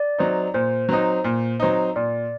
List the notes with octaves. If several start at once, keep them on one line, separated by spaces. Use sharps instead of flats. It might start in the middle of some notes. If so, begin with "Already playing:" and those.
Already playing: D5
F#3 C4 D#4
A#2 C5
F#3 C4 D#4
A#2
F#3 C4 D#4
A#2 D5